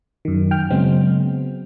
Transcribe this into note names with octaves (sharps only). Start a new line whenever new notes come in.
F#2 D#3
G5 F6
C#3 F#3 G#3 B3 C4